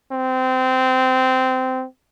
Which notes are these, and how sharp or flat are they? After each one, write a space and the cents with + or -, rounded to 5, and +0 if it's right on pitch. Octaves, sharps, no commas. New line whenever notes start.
C4 -20